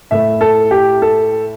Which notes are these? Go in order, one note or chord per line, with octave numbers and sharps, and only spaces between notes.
A2 A3 E4 E5
A4
G4
A4